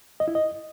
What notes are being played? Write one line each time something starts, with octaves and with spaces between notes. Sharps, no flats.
D#5
E4
D#5